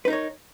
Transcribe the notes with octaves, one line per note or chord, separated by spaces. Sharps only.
D#4 A#4 B4 C#5